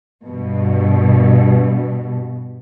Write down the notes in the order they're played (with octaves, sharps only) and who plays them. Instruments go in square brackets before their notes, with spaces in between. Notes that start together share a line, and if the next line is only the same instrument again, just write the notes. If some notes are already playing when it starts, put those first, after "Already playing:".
[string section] G2 B2